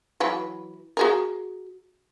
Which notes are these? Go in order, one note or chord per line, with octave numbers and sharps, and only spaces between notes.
E3 F#3 B4
F#4 G#4 A#4